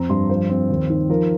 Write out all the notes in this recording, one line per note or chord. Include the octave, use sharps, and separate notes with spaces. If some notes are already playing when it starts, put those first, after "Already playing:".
Already playing: F2 C4 A#5
G2 C6
F3 C5
C4
D#2
D#3
F3 A#4